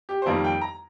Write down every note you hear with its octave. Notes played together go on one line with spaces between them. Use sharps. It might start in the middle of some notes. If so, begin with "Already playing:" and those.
G4
C5
F2 D#3 G3 A#3 A#4
G5
A#5